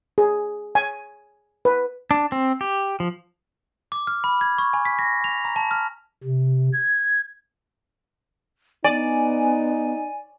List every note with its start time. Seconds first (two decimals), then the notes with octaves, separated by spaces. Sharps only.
0.18 G#4
0.75 G#5
1.65 B4
2.11 D4
2.32 C4
2.61 G4
3.00 F3
3.92 D6
4.07 F6
4.24 B5
4.41 G#6
4.58 C#6
4.73 G#5
4.85 B6
4.99 A#6
5.24 F7
5.45 A#5
5.56 A5
5.71 F6
6.23 C3
6.73 G#6
8.84 B3 D#4 D5 G#5